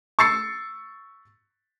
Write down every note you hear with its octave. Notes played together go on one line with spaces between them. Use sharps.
C#6 E6 A6 C7 C#7